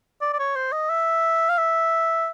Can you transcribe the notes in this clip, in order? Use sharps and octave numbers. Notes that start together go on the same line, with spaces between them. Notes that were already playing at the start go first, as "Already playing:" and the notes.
D5
D5
C#5
C5
D#5
E5
F5
E5